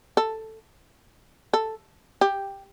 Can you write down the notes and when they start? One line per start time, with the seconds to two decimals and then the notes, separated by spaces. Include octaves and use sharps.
0.17 A4
1.53 A4
2.21 G4